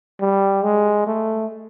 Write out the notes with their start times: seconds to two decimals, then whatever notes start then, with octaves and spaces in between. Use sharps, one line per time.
0.21 G3
0.63 G#3
1.07 A3